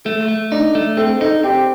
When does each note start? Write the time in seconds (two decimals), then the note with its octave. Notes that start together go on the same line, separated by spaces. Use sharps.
0.05 A3 A4
0.28 A3
0.52 D4 D#4
0.75 A3
0.97 C4 A4
1.21 D#4 A4
1.43 C4 G4